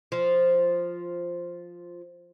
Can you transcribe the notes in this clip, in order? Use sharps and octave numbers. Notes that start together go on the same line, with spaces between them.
F3